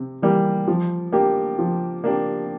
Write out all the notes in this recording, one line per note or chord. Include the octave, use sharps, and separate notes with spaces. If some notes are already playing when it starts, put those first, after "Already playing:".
Already playing: C3
E3 G3 A#3
F3
A#3 D4 G4
F3
A#3 D4 G4